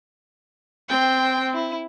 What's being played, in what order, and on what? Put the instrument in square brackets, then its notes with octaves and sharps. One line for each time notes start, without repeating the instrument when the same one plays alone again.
[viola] C4 [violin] G5
[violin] E4